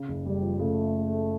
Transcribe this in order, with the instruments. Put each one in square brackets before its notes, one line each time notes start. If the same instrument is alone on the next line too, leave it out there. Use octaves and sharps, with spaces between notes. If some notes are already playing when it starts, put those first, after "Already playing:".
Already playing: [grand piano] C#3
F#1
[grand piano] F#1 [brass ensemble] G3
[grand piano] F3
[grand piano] C#3 [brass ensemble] A3